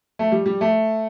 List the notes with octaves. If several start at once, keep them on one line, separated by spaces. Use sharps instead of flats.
A3
G3
G3
A3